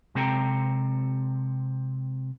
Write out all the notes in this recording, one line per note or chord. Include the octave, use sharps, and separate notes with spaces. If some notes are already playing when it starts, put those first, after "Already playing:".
C3 G#3 C4 A4 G5 A#5